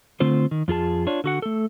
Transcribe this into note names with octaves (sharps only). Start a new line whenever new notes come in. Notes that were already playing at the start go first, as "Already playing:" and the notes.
D3 A3 C4 F4 C5
D#3
F2 F4 G#4 A5
D4 F4 C#5
D3 F#4 F#5
A3 A4